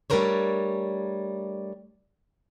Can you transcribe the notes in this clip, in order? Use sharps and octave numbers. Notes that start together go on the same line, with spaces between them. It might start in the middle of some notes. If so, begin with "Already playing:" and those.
G3 A3 D4 A#4 C5 C#5